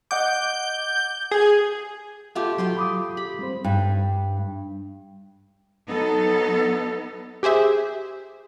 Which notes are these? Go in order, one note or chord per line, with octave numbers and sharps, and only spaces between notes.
D#5 F#5 D6 G6
G#4
A3 F4 G4 F#5 D6 G6
F#3 F4 G5 C6
B5 D6 D#6
G4 B5
G3 C4 C5
G2
F#3 B3 D#4 A4
G4 G#4 C5 E5